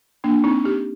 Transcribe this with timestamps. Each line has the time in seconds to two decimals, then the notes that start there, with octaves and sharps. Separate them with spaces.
0.24 A#3 D4
0.44 C4 D#4
0.64 D#4 G4